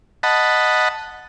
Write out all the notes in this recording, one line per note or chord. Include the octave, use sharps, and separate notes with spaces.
D#5 F#5 A5 B5